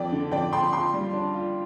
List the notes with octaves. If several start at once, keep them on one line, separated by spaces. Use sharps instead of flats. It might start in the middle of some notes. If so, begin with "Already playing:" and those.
Already playing: F2 D5 G5
D3
F2 D5 G5
F2 G5 C6
F4 G5 C6
G3
D4
F4